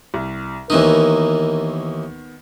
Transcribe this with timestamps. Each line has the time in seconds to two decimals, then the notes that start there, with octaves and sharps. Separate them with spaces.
0.14 C2
0.70 D#2 D#3 E3 B3 D#4 A#4